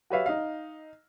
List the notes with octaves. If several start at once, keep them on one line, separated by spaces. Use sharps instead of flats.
F#4 G4 B4 C#5 E5 F5
D#4 F5